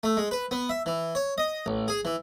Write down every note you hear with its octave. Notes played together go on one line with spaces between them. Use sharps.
A3
G#3
B4
B3
E5
E3
C#5
D#5
A1
G#4
E3